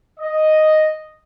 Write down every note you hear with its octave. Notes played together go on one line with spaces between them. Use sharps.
D#5